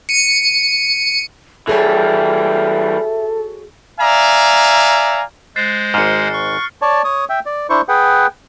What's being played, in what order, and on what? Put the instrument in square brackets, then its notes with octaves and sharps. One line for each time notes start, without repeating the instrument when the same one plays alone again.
[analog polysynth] C#7 D#7
[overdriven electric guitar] E3 G3 [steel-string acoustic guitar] F#4 G#4 C#5 [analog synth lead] A4 [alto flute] E5
[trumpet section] D5 E5 F5 G#5 A#5
[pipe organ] G#3 C5 [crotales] F#6 A6 C7
[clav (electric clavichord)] G#1 G#2 [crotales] F6 C#7
[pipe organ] C#6
[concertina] C#5 D5 A5
C#5 D#6
E5 G5
D5
D4 E4 C5 C#6
G#4 B4 F#5 G5